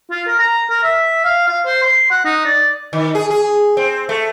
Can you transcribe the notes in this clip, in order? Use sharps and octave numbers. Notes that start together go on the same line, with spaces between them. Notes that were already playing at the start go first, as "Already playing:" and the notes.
F4
A#4
A#5
A#4
E5
F5
F5
C5
C6
F#5
D#4
D5
D#3
G#4
G#4
C4
A3